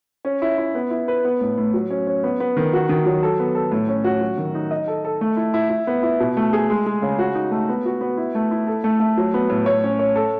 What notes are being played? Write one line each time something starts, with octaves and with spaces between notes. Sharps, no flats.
C#4
E4
E4
B3
E4
B4
B3
A2
A2
F#3
C#4
C#4
B3
B3
D#3
F#4
D#3
F#3
A4
B3
A4
A2
C#4
F#4
F#3
D#3
D#4
D#5
A4
A4
A3
E4
E4
E4
B3
E4
B2
A3
G#4
G#3
G#3
C#3
F#4
D#4
A3
B3
F#4
B3
E4
A3
E4
A4
A3
A3
F#3
B3
A2
C#5
C#4
C#5
A4